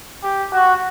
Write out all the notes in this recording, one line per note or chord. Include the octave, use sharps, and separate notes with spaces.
G4
F#4